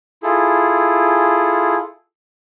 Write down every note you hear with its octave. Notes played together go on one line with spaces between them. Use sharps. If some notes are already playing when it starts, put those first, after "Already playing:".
E4 F4 G#4 A4